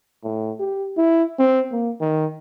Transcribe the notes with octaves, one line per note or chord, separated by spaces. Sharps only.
A2
G4
E4
C4
A#3
D#3